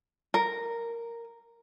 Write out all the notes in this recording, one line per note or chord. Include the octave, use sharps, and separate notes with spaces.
A#4